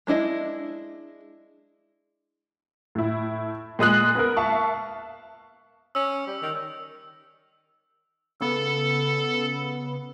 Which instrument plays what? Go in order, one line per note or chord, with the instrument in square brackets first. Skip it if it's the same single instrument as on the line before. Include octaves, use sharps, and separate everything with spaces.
[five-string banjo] G#3 D4 E4 D#5
[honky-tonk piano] A2 E4
A#2 G#3 D#6 F#6
B3 A#4
E5 F5 A5 C#6
[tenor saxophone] C#4 [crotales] E6
[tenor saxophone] G3
D#3
[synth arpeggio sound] C#3 B3 [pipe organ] A4